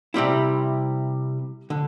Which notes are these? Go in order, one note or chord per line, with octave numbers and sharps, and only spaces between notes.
C3 G3 C4 E4
D3